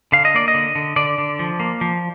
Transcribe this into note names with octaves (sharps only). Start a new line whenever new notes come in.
D3 F5
D#5
A#3 D5
D#5
D3
D3
D3 D5
D3
F3
A#3
F3